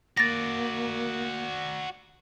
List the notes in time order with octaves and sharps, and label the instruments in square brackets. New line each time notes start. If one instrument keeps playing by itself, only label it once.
[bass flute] A#3 [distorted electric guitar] F#4 D5 [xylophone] A6 A#6